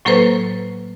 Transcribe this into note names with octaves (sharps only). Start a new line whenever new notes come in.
A2 F#3 A#3 A4 B4 C5